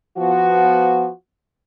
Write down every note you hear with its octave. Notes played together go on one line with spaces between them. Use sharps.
F3 B3 F#4